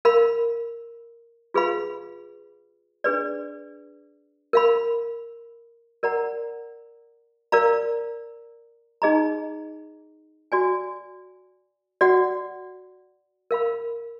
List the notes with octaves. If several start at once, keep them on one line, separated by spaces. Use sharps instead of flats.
A#4 F5 B5
F4 G#4 B4 F5 B5
D4 G#4 B4 D5
A#4 F5 B5
A#4 D5 F#5 A#5
A#4 D5 F5 A#5
D#4 G#4 D#5 A#5
F#4 D5 G#5
F#4 D5 F#5
A#4 F5 B5